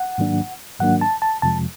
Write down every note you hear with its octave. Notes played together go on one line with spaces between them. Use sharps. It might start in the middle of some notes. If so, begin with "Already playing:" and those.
Already playing: F#5
G#2 D#3 F#3 A#3 D4
G#2 D#3 F#3 A#3 D4 F#5
A5
A5
F2 C3 F3 G#3 A5